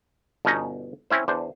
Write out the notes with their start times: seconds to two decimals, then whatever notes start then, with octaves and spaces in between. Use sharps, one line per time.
0.45 G1 B2 B3 C#4 D#4 A#5
1.10 C4 C#4 E4 C5
1.28 E2 D4 C5